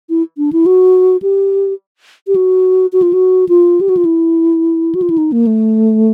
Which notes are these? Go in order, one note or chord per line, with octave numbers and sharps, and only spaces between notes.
E4
D4
E4
F#4
G4
G4
F#4
F#4
F4
F#4
F4
G4
F#4
F4
E4
F#4
F4
E4
D#4
A#3
A3